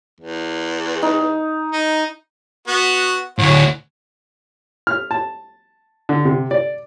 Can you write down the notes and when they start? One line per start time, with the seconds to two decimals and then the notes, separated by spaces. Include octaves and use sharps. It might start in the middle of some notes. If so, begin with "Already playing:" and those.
0.20 E2
1.02 D#4
1.72 D#4
2.68 B3 F#4
3.39 D2 A2 F#4 C#5
4.87 F6
5.11 A5
6.09 D3
6.25 C3
6.51 D5